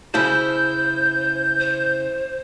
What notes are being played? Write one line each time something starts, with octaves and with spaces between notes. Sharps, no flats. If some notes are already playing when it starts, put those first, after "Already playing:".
C#3 E4 C5 A5 G6
C5